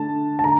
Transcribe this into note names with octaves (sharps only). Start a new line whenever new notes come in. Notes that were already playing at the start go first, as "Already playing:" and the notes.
Already playing: D3 A3 D4 A5
A5
D3 A#5